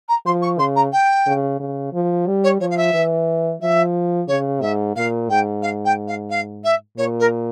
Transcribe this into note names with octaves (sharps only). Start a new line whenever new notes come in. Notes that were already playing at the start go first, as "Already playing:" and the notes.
A#5
F3 C6
C#6
C#3 C6
A#5
G5
C#3
C#3
F3
G3
C#5
F3 C#5
F5
E5
E3
F3 E5
C#3 C#5
G#2 E5
A#2 F5
G#2 G5
F5
G5
F5
F5
E5
A#2 C#5
A#4